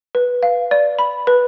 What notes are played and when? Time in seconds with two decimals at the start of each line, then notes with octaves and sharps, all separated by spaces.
0.15 B4
0.43 F5
0.71 D5
0.99 B5
1.27 B4